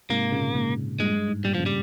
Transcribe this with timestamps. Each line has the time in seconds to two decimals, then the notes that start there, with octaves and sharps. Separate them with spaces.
0.10 G#2 C3 A#3
0.32 A#2 C#3
0.54 G#2
0.99 G2 A#2 G#3
1.15 G2
1.29 G#2
1.44 G2 A#2 G3
1.55 A#2 C#3 F3
1.66 G3